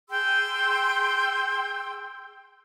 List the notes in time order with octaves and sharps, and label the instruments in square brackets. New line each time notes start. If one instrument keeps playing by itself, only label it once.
[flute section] G#4 G5 C6 E6